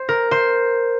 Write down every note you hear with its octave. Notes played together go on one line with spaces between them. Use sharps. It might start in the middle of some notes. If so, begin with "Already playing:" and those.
Already playing: C5
A#4
C5